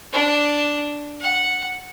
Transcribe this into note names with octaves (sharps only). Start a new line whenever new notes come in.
D4
F#5